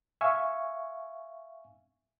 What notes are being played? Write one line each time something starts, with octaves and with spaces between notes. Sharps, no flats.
E5 F5 G#5 C#6